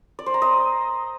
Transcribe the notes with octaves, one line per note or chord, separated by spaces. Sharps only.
D5
C5
A#5
D#5